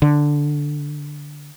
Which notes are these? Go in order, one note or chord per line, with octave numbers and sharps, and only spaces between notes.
D3